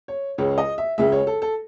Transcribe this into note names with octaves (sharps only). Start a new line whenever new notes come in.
C#5
C#2 C#3 G#3 C#5
D#5
E5
C#2 C#3 G#3 E5
C#5
A4
A4